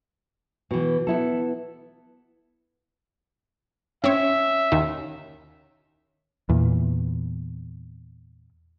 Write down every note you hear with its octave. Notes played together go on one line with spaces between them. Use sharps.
B2 E3
B3 E4 A4
C4 C#4 C#5 E5
D#2 D#3
E2 A#2